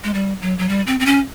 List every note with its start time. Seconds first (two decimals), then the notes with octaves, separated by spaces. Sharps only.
0.04 G#3
0.14 G3
0.42 F#3
0.58 F#3
0.69 G3
0.87 C4
1.00 C4
1.06 C#4